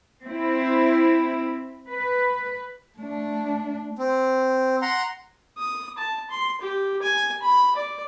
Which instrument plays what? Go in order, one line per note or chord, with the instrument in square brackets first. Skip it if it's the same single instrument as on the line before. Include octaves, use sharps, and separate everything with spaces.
[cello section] C4 E4
B4
[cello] A3 D4
[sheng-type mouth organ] C4
F#5 A#5 C6
[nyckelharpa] D#6
A5
C6
G4
G#5
B5
D5